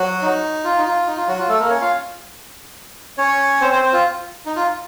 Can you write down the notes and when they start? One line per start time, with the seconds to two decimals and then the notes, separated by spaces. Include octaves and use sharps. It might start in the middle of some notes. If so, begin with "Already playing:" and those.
Already playing: F#3 F#4
0.22 D#4
0.64 F4
0.78 D#4
0.85 F4
1.07 D#4
1.17 F4
1.28 F#3 F#4
1.38 F4
1.49 A3 A4
1.60 A#3 A#4
1.70 C#4 C#5
1.81 F4 F5
3.18 C#4 C#5
3.60 C4 C5
3.71 C4 C5
3.81 C4 C5
3.93 F4
4.46 D#4
4.56 F4